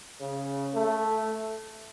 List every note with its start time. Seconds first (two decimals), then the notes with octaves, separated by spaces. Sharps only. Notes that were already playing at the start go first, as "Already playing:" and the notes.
0.21 C#3
0.74 A3